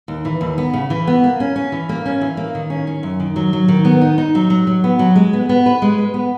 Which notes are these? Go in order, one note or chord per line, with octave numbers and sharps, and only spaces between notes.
D#2
E3
D#2
B3
C#3
E3
B3
A#3
C#4
C#4
E3
A#3
C#4
E3
A#3
D#3
C#4
C#4
F#2
D#3
F#3
F#3
D#3
B3
D#4
D#4
F#3
F#3
F#3
B3
F#3
G#3
B3
B3
B4
G#3
B4
B3